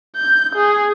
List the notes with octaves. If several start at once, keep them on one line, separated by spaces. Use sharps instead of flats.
G6
G#4